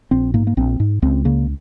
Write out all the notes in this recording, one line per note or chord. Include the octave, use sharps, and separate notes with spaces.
A#1 C4
G#2 A#3
A#3
A#1 C4
G#2
C#2 C4
C#3 A#3